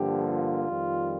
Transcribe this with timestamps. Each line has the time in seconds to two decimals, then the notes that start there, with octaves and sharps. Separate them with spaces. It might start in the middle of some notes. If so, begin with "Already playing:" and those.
Already playing: G2 D3 F3 A#3 G4
0.29 F4
0.68 F2 D#3 G3